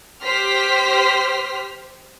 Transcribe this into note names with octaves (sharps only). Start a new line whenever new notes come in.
G4 C5 F6 B6